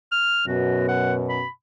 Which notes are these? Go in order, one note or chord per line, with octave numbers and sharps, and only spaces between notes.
F6
F#2 B2 F#4
F#5
B5